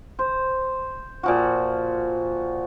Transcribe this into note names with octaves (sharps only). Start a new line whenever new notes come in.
C5
A#2 F3 F#4